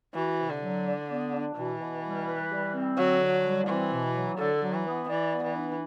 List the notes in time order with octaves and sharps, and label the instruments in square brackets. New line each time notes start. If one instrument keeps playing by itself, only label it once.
[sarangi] E3 [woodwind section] F#4
[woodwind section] C3
[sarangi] D3
[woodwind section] F#3
D5
B3
D4
[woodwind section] B2 [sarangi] E3
[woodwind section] B2
G3
B4
G3
C4
[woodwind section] D3 [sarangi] F#3
[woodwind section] D3
G3
[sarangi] E3 [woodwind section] C4
[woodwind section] B2
F#3
[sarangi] D3 [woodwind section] A4
[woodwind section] F#3
[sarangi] E3
[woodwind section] B3
[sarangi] E3 [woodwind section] D5
[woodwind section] B3
[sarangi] E3
[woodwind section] D4